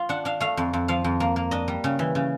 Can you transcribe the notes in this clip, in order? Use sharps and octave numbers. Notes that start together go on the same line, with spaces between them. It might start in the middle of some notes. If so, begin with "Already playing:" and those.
Already playing: F4
D4 F#5
D4 F5
A3 F5
F2
F2
F3 F5
F2
A#3
A#3
D4 D#5
G3
C#3
E3
C#3